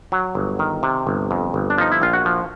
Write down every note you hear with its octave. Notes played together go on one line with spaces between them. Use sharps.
F#3
G1
D#3
C3
G1
F2
G1
D4
F3 D#4
E4
A#1 F4
F#4
F3